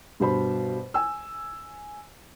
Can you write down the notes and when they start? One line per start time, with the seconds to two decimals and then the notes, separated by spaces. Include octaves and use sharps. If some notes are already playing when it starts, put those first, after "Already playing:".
0.20 G2 B2 C5 B5
0.94 G#5 E6